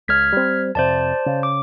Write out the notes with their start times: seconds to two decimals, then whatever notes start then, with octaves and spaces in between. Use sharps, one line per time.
0.08 C#2 F6 G#6 B6
0.32 G3 C4
0.75 F2 C3 C5 D5 A5
1.26 C#3
1.43 D6